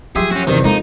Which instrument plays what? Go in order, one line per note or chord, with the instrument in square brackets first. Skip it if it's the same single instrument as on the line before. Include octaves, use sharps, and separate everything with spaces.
[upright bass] F3 F#3 [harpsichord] G4 E5 C6 [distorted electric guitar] G#4
[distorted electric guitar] C#4 F#4
[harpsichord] E2 G2 C3 [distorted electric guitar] D#3
[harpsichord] F2 A#3 [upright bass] G#3 E4 [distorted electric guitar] D#4